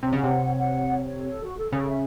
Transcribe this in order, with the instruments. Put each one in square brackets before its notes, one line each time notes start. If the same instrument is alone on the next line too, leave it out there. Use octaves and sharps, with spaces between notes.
[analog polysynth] C3 [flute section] C#5
[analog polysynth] C#3 [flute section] F#5
[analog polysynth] C3
[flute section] C#5
C#5
F#5
C#5
C#5
C#5
A4
A4
F#4
A4
[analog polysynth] C#3 [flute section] A4
[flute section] E5